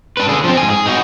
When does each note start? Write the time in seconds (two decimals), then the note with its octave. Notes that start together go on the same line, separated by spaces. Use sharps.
0.17 D4 B4
0.29 D3 G#4
0.44 F3 C4
0.57 G#2 G#5
0.70 G#4
0.86 D#4 F#4